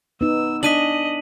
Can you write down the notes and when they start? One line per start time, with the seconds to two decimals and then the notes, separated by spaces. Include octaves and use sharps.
0.21 B3 D#4 E6
0.63 D4 D#5 G#5 B6 D#7 F#7